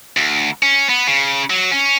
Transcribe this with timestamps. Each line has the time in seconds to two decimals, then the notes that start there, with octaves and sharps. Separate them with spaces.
0.17 D2
0.63 C#4
0.89 B3
1.07 C#3
1.50 F#3
1.71 C#4